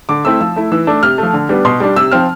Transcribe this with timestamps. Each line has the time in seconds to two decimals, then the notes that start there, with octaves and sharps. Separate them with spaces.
0.09 D3 D6
0.25 A3 C4 E4 E6
0.41 F3 E6
0.56 A3 E4
0.72 E3 E6
0.87 A3 D4
1.03 C3 F6
1.18 F3 A3
1.33 D3
1.49 G3 B3 D4
1.65 B2 C6
1.80 G3 D4
1.96 C3 E6
2.11 F3 C4 F6